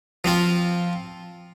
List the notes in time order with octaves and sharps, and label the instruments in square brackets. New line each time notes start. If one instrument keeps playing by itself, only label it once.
[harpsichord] F3 C4 F4